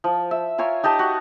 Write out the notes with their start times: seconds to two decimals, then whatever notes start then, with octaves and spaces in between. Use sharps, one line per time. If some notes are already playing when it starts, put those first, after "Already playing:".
0.04 F3
0.31 E5
0.58 F4 A#4 C#5 G#5
0.83 D#4 G4 D#5 A5
0.99 F#4